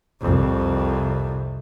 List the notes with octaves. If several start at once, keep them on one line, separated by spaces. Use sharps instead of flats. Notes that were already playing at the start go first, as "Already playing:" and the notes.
C2 F2